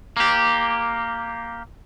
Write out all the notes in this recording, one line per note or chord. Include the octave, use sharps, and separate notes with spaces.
A#3 G4